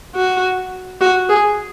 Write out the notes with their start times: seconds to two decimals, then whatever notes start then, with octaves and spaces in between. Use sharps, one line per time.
0.15 F#4
1.01 F#4
1.29 G#4